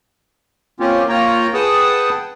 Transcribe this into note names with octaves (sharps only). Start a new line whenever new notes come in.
A#3 C4 C#4 F4 G4
A#3 F4 C#5 G5 A#5
G#4 B4 F#5 G5 A5 D#6